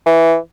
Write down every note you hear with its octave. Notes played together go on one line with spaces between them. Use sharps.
E3